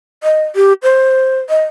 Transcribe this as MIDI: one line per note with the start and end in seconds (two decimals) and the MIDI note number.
0.24 0.44 75
0.56 0.73 67
0.83 1.38 72
1.50 1.64 75